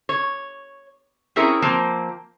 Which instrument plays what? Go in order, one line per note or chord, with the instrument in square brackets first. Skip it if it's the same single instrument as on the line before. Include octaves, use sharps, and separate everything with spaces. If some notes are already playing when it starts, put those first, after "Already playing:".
[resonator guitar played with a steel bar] C#5
C4 C#4 E4 G#4 A#4 C#5
F3 A#3 C4